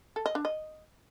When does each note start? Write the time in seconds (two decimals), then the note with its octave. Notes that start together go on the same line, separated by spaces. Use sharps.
0.16 A4
0.26 D#5
0.35 D4
0.45 D#5